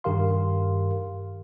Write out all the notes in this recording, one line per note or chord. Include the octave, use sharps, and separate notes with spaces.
G2 D#3 G4 A#4 F5 C6